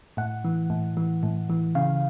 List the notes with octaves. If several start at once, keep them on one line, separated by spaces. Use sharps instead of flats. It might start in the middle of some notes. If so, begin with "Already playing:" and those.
A2 F#5
E3
A2
E3
A2
E3
C#3 F5